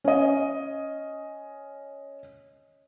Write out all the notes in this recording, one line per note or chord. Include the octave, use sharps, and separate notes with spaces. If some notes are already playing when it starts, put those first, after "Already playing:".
C#4 D#5